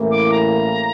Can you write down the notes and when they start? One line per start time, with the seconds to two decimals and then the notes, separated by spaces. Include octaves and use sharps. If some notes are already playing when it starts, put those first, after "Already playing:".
Already playing: A1 A2 E3 A#3
0.11 D6
0.31 A#5